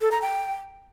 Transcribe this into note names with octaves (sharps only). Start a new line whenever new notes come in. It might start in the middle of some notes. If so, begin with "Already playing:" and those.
A4
A#5
G5